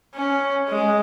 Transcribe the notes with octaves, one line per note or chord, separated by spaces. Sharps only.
C#4
G#3